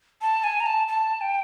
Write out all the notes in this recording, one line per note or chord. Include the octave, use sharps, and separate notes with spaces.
A5
G#5
A#5
A5
A5
G5